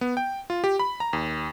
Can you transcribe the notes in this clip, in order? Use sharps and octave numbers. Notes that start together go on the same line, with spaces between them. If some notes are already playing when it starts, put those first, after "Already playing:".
B3
G5
F4
G4
B5
A#5
D#2